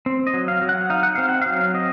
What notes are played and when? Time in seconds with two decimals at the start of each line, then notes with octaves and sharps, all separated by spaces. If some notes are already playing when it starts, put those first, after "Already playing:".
0.06 C4
0.27 D#5
0.34 F#3
0.48 F5
0.62 F#3
0.69 F#5
0.90 D#4 F5
1.03 F#5
1.15 C4 F5
1.29 F#5
1.42 F#3 F5
1.74 C4 D#5